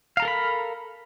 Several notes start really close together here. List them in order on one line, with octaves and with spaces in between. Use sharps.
F5 A#5 A4 A#4 B5